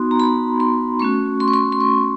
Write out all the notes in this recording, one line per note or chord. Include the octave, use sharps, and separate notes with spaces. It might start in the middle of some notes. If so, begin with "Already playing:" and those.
Already playing: B3 D#4 F#4 C6
A#5
B5
C6
A3 C#4 F#4 C#6
C6
C#6
C6
C6
C#6